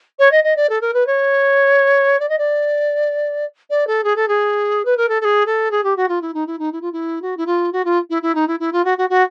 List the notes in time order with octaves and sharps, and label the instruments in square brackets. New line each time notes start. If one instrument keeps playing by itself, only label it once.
[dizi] C#5
D#5
D#5
D5
A4
A#4
B4
C#5
D5
D#5
D5
D5
A4
G#4
A4
G#4
B4
A#4
A4
A4
G#4
A4
G#4
G4
F#4
F4
E4
D#4
E4
D#4
E4
F4
E4
F#4
E4
F4
F#4
F4
E4
E4
D#4
E4
E4
F4
F#4
F#4
F#4